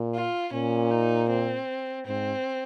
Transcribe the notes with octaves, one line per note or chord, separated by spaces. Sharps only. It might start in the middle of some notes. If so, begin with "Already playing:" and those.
Already playing: A#2
F4
A#2 C#4
D#4
C4
G#2 C4